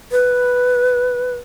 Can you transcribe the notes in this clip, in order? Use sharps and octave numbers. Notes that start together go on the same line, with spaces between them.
B4